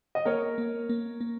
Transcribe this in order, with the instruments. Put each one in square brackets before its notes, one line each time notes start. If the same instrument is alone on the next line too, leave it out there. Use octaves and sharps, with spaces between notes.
[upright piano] D#5
[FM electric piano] A#3 [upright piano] A#4 C#5
[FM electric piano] A#3
A#3
A#3